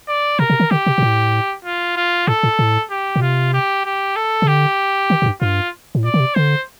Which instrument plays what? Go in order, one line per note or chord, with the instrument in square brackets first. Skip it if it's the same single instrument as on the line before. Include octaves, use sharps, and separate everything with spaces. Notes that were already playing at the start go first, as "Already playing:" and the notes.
[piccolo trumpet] D5
[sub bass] C3 [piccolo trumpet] A#4
[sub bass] C3
D#3
[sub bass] D3 [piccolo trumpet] G4
[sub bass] C3
A#2
A2
[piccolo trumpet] F4
F4
[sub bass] A2 [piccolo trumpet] A4
[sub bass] A2
A2
[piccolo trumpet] G4
[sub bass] A#2
[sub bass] C3 [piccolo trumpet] F4
[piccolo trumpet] G4
G4
A4
[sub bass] C3
[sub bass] D3 [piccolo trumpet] G4
[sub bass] D#3
A2
G2
[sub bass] G2 [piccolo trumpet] F4
[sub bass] A2
[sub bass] A#2 [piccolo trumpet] D5
[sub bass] D3
C3
[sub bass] D3 [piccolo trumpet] C5